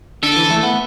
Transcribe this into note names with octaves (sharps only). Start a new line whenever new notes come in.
D3 A4
E3
A3
B3